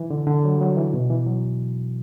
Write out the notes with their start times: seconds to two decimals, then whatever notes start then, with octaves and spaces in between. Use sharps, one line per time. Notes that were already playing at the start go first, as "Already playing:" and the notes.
Already playing: E3
0.10 D3
0.27 D3
0.45 F#3
0.55 G3
0.61 F#3
0.77 E3
0.93 B2
1.10 E3
1.27 F#3